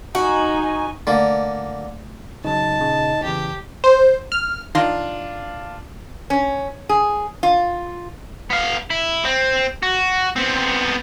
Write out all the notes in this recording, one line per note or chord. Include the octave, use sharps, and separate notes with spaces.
D#4 F#4 G#5
D3 A3 A#3 D5
C#3 F#3 D#4 A5
A#2 C#3
E2 C#3 E3 G4
C5
F6
D#3 D4 F4 F5 C6 A#6
C#4
G#4
F4
B3 F5
E4
C4
F#4
B3 C4